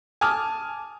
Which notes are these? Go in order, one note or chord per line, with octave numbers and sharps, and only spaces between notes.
G#5 A5 D6 D#6 F6